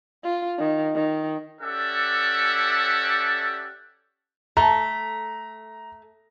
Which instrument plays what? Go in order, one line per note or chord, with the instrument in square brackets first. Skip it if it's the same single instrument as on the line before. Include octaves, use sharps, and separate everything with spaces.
[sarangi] F4
D#3
D#3
[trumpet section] C#4 G4 A4 D5 E5 F#5
[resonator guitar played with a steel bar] A3 [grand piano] A#5